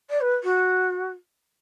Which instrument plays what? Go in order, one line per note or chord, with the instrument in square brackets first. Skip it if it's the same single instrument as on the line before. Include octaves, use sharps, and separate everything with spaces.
[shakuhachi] D5
B4
F#4